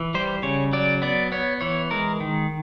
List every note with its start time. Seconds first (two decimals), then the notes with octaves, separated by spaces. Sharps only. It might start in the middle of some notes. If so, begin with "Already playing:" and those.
Already playing: E3
0.14 G3 C5
0.43 C#3 C#5
0.73 F#3 D5
1.02 B3 D5
1.32 B3 C#5
1.61 E3 C#5
1.91 G#3 A#4
2.20 D#3